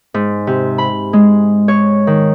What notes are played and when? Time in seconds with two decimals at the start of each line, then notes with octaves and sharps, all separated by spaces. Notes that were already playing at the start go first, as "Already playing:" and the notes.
0.14 G#2
0.47 C3
0.78 B5
1.13 G#3
1.68 C#5
2.07 D#3